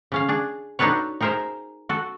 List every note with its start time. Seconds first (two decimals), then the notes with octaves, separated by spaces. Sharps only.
0.12 C#3 C#4 F5
0.28 D4 G#4
0.79 D4 D#4 F#4 A4 B4 C#5
1.21 D#4 G#4 A#4 C5 E5
1.89 F#4 A4